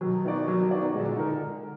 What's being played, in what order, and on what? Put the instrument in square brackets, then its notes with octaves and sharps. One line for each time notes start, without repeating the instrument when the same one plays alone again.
[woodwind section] B2 D#3 [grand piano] F#3
[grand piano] B3 D#4 F#4 D5
F#3
B3 D#4 F#4 D5
[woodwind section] A#2 D3 [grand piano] G#3
[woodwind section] A#2 D3 [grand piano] D#4 A#4